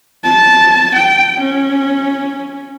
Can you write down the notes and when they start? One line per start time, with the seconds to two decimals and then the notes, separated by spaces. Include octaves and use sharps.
0.24 A5
0.96 G5
1.41 C#4